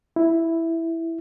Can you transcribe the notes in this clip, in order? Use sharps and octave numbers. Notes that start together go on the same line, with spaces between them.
E4